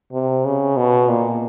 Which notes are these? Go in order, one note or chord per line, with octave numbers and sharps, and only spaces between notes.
C3
C#3
B2
A#2